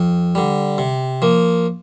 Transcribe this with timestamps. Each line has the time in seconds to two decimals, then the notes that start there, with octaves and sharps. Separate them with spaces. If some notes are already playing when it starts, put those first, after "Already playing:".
Already playing: F2
0.35 D3 G3
0.78 C3
1.22 F3 A#3